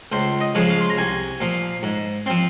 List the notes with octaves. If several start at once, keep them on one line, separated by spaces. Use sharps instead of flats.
C#2 C5
D#5
C#3 F3 G#3
F5
C6
A#5
C2 G#5
A#2 F3
G#2
F3 C4